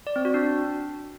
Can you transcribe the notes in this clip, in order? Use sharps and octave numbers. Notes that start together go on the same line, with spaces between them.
D5
C4
F#4
D4